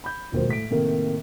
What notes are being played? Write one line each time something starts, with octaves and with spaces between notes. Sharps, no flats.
B5 G6
E1 A#2 D#3 F#3 C5
A2 B6 D7
A2 C3 D#3 A3 A#3